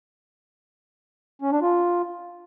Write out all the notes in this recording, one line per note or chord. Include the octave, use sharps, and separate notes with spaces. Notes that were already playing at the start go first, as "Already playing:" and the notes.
C#4
D4
F4